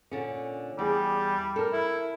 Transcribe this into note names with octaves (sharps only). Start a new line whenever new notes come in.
A#2 D3 C#4
E2 G3 G#4
A4 A#4
E4